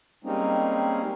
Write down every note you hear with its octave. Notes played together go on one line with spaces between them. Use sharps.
G3 G#3 A#3 C4 C#4 D#4